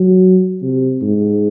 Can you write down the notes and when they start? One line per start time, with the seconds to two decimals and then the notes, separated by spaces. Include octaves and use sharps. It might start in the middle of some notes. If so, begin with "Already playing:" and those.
Already playing: F#3
0.62 C3
1.02 G#2